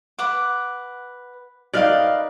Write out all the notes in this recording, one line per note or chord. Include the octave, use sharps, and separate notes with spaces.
B4 F#5 D6
D#4 A#4 B4 D5 F5